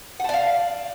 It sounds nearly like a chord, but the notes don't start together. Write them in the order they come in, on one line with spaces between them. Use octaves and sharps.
F#5 A5 D5 F5